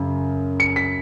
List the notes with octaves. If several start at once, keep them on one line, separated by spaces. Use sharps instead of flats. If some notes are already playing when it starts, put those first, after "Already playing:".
Already playing: F#2 C#3
C#7
B6